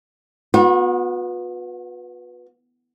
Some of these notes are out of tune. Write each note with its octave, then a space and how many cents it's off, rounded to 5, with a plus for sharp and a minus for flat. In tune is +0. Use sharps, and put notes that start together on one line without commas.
B3 -5 F#4 -45